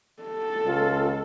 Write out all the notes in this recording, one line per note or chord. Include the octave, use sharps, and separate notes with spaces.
A4
C#2 F4